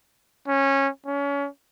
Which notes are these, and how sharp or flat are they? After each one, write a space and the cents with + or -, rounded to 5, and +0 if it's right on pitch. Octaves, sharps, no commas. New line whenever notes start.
C#4 -15
C#4 +30